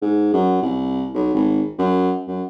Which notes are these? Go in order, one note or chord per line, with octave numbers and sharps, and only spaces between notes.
G#2
F#2
C2
B1
G#1
F#2
F#2